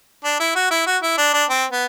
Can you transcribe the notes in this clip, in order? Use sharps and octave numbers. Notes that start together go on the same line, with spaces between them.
D4
E4
F#4
E4
F#4
E4
D4
D4
C4
B3